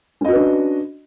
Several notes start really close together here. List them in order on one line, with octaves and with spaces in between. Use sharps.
C#4 D#5 F#4 B4 D4